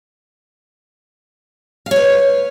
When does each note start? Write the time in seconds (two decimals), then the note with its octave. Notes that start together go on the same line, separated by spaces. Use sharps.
1.86 F5
1.91 C#5
1.96 B4